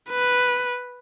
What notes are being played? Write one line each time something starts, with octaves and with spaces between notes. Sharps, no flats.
B4